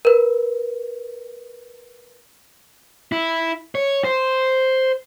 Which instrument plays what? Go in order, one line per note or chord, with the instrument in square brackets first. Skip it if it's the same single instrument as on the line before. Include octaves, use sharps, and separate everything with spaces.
[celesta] A#4 B4
[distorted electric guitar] E4
C#5
C5